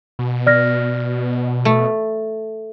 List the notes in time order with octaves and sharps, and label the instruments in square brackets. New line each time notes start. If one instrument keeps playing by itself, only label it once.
[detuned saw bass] B2
[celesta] D5 F6 A#6
[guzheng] A3